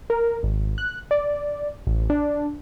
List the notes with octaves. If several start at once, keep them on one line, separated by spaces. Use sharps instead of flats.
A#4
G#1
F#6
D5
A1
D4